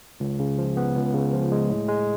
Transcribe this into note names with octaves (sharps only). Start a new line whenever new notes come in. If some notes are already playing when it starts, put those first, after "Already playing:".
C#2
C#3
F3
B3
C#2
C#3
F3
G#3
A2
G#3